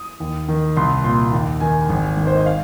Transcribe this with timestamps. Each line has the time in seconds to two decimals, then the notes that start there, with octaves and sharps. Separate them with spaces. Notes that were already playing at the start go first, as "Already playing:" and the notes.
Already playing: D#6
0.20 D#2
0.48 D#3
0.77 C2 C6
1.04 A#2 C6
1.32 D#2
1.60 D#3 G#5
1.89 G#1
2.17 G#2 D#3
2.27 C5
2.36 D#5
2.46 F5